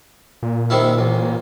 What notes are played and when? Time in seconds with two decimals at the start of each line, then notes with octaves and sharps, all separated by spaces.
0.43 A#2
0.70 C3 D#3 E4
0.99 A1